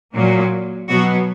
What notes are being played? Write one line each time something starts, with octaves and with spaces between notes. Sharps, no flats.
A#2 F#3 A#3
B2 F#3 B3 F#4